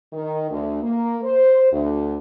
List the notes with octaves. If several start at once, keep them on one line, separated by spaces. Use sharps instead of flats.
D#3
D2
A#3
C5
D2